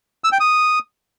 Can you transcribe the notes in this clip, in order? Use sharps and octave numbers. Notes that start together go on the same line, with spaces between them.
E6
G5
D#6